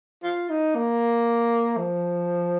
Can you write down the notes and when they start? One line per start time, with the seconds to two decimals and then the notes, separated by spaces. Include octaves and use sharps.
0.24 F4
0.50 D#4
0.75 A#3
1.77 F3